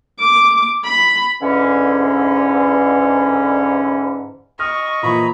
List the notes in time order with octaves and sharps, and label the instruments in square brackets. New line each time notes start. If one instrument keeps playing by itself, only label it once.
[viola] D6
B5
[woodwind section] G#2 D3 E3 C#4
[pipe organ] D#5 [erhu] C#6 [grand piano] F6
[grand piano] A#2 E3 F3 [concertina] A#5 B5